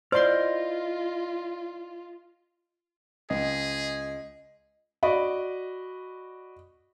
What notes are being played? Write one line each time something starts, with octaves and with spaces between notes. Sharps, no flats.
E4 F4 C5 D5 D#5 C6 F6
C#2 G#4 D#5
F#4 D5 D#5 B5